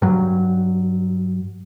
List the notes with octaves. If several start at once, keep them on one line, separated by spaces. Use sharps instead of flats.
G2 F#3